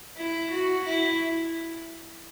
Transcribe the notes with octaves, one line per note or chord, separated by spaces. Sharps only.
E4
F#4
E4